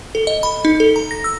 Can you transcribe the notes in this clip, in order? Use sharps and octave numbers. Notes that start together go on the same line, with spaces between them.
A4
D#5
B5
D#4
A4
A#5
A#6
E6